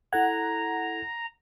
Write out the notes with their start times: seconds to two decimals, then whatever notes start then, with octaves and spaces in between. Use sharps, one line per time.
0.13 E4 A4 F#5 A#5 G#6